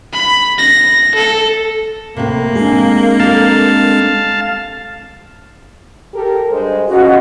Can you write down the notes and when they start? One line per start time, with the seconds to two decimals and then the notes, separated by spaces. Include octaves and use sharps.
0.13 B5
0.58 A#6
1.15 A4
2.17 A2 C3 A#3
2.55 G#3 C4 D4 G#4
3.20 G3 A4 F5 A5
6.13 G4 A4 A#4
6.50 G2 G#3 C5
6.88 C#4 D#4 F4 F#4 D#5